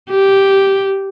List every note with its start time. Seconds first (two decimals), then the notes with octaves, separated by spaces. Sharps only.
0.10 G4